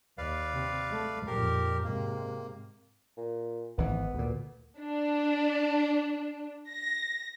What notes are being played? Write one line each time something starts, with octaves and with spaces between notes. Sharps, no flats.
D#2 B4 D5 F5
C3
A3
F2 A#2 G4 A#4
G#2 C3 A#3
A#2
G#1 E3 B3
D2 A#2
D4
A#6